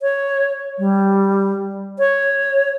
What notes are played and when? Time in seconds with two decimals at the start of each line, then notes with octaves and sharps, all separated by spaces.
0.01 C#5
0.79 G3
1.99 C#5